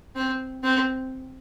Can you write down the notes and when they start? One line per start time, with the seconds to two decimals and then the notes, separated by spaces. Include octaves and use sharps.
0.16 C4
0.64 C4